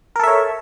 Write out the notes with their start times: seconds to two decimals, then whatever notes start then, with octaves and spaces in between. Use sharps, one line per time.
0.16 A#4
0.20 A4
0.23 E5
0.27 C#5